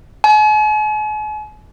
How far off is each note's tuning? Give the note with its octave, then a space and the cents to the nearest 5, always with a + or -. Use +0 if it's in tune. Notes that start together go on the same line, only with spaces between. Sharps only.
G#5 +45